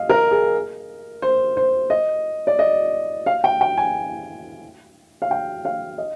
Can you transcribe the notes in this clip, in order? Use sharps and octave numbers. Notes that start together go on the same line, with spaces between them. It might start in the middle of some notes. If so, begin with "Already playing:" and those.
Already playing: D#5 F5
A#4
G#4
C5
C5
D#5
D5
D#5
F5
G5
G5
G#5
F5
G5
F5
D#5